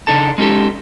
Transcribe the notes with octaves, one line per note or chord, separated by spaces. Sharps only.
C#3 D4 D#4 A4 A5
G#3 C#4 D#4 G4 A4